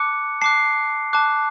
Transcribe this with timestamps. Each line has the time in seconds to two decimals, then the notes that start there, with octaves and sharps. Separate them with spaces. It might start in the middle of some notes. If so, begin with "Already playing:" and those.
Already playing: A5 D6 F#6 C#7
0.41 A5 D6 F#6 C7
1.13 A5 D6 F#6